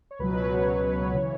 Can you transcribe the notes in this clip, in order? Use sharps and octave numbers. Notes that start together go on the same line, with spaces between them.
C#5
C#2 B2 F#3 B4
C#5
C#3 E3